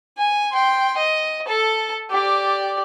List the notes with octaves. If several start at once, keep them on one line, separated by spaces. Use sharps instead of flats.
G#5
G5 C6
D#5
A4 A5
G4 D5